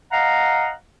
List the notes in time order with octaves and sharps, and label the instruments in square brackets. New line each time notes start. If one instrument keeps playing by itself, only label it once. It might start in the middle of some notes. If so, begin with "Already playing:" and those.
[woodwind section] D#5 F5 F#5 A#5